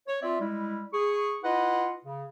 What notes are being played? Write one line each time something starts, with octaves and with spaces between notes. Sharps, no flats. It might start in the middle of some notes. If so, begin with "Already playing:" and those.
C#5
C4 F4 D5 E5
G3 G#3 E4
G#4 C#6
E4 F4 B4 D#5 F#5
C#3